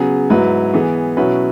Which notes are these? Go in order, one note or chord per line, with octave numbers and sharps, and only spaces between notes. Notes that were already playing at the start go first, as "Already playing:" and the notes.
Already playing: C#3 F#3 B3 G#4
G#2 F#3 E4 B4
E3 B3 G#4
B2 F#3 C#4 E4 B4